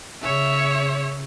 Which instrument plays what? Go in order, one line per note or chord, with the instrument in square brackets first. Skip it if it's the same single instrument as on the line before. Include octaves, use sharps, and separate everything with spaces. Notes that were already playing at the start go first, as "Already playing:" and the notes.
[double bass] C#3 [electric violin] C#5 E5